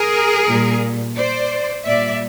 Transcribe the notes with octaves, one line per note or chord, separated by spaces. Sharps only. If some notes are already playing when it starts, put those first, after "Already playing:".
Already playing: G#4 A#4
A#2 G3
C5 D5
A#2 G3 D5 E5